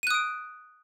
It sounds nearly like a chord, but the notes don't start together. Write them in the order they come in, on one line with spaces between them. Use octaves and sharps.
D#7 F#6 D#6 D7